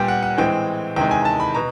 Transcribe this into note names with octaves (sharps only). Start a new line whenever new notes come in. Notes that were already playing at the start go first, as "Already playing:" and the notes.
Already playing: A#2 G3 B3 G5 G#5
F#5
F#5
A2 E3 G#3 C4 G5
E2 C3 D#3 G#3 G5
G#5
A5
B5
B2 A#5